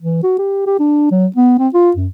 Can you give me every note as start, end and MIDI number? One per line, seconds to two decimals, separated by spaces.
0.01 0.21 52
0.23 0.34 66
0.38 0.65 67
0.67 0.78 67
0.79 1.07 62
1.11 1.27 54
1.36 1.55 59
1.59 1.68 60
1.74 1.91 65
1.96 2.07 42